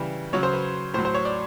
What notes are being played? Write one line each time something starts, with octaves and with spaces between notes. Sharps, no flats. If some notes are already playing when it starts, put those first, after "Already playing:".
Already playing: C#3 E3 G3
C#3 F#3 C#5
C5
B4
A2 F#3 C5
C5
C#5
D5